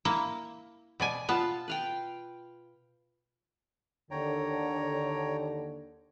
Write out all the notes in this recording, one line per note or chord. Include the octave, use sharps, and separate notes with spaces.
A#3 E4
B2 D5 G#5
B3 F4 F5 A5
B4 F5 G5
D#2 D3 C#5 G5 A#5